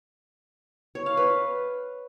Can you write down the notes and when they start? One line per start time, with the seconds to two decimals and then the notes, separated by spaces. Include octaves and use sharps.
0.95 C#5
1.06 F5
1.17 B4